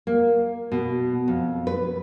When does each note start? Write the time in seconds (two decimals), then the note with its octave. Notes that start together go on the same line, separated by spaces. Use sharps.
0.07 A#3
0.72 B2
1.28 F2
1.67 B4